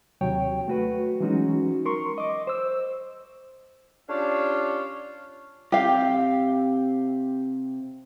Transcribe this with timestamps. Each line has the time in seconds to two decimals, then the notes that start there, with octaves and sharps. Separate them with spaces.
0.21 D#2 C3 F#3 C#5 G5
0.68 A3 F#4 B4
1.20 E3 F#3 G#3 C#4 D#4 F#4
1.85 A#4 C6 C#6
2.18 D#5 D6
2.47 C5 E6
4.09 C#4 D4 F4 G4 C#5 F5
5.72 C3 G4 F5 G5